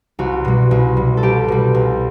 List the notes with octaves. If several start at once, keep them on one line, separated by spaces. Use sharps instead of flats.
C2 F#4
B2 G3
C2
B2 G3
A4
C2 G4
B2 G3
C2